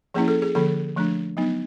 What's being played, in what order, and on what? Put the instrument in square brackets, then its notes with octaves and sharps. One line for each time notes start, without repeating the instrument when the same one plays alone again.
[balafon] F3 A#3 C#4 E4 G#4
A4
G#4
D3 F3 A#3 A4
F3 A3 D4
F#3 B3 D#4